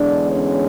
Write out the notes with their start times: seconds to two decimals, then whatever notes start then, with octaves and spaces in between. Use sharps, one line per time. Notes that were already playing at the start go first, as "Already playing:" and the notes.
Already playing: E2 D3 G#3 D4 D5
0.31 C#4 C#5